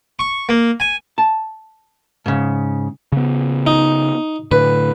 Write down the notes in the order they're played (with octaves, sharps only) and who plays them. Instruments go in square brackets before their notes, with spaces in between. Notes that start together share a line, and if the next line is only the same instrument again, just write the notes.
[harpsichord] C#6
A#3
G#5
[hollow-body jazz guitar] A5
G#2 C#3
[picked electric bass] C#3 B3
[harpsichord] D#4
[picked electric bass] A2 D3 [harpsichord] B4